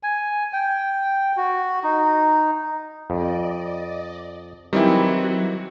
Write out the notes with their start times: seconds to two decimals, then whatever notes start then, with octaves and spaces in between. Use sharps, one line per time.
0.03 G#5
0.53 G5
1.37 F#4
1.84 D#4
3.10 F2 D5 D#5
4.73 D#3 E3 F#3 G3 C4 E4 F#4